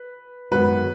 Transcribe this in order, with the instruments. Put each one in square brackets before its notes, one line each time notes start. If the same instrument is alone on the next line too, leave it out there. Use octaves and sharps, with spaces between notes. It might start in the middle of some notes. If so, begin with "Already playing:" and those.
Already playing: [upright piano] B4
[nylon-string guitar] F#2 D#3 G#3 B3 F#4 [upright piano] B4